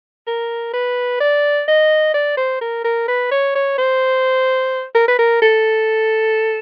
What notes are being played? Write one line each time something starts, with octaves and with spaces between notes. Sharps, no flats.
A#4
B4
D5
D#5
D5
C5
A#4
A#4
B4
C#5
C#5
C5
A#4
B4
A#4
A4